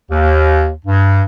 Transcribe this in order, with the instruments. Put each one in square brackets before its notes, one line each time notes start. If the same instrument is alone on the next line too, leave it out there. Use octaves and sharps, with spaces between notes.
[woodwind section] D#2
G2